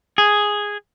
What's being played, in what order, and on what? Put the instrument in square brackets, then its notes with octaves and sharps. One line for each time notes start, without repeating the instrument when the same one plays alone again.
[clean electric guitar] G#4